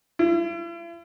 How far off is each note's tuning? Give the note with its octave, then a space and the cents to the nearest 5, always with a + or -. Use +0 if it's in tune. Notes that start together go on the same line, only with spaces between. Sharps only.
E4 +45